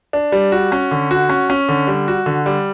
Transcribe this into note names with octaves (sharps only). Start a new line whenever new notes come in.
D4
G3
F#4
C#4
D3
F#4
C#4
C#4
D3
G3
F#4
D3
G3